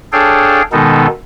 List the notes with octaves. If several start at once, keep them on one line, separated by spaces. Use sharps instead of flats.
D4 G#4 A4 C#5 F5 G5
B2 D#3 G#3 B3 D#4 A4